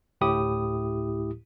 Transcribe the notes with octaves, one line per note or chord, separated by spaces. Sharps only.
D2 A2 E4 G4 D#6